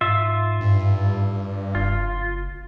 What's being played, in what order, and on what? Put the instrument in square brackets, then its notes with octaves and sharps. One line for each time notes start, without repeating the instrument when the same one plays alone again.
[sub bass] G#2 [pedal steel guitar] F4 E5
[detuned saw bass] G2
[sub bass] F#1 [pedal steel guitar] F4